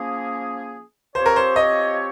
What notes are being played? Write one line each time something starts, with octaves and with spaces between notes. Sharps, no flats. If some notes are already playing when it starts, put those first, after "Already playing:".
Already playing: F3 A#3 C#4 G#4
F3 C4 G4 C5 C#5
A#4
C5
D#5